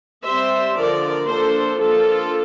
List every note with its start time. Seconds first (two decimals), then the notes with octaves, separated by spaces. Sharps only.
0.24 G3 C4 C5 E5
0.76 D3 F3 A#3 A#4 D5
1.28 F3 A#3 D4 A4 C5
1.80 F3 A#3 D4 F4 A4